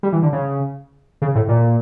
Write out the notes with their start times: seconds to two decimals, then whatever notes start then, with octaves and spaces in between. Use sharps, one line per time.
0.03 G3
0.12 E3
0.23 D3
0.33 C#3
1.22 C#3
1.35 A2
1.48 A#2